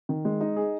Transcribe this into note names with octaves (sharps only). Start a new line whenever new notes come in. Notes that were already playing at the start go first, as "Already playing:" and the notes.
D#3
G#3
D#4
G#4